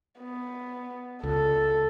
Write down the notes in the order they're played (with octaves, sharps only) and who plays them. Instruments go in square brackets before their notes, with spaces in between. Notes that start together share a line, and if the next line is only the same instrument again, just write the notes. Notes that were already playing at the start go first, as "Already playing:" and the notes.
[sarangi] B3
[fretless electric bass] C#2 [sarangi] A4